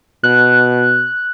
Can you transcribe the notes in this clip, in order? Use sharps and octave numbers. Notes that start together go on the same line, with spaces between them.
B2 F#6